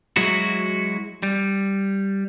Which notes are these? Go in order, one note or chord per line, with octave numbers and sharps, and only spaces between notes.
F#3 G#3 E4 F#4
G3